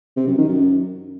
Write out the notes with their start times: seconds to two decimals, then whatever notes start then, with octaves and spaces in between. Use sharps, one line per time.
0.16 C3
0.27 F#2
0.38 D#3
0.48 F#2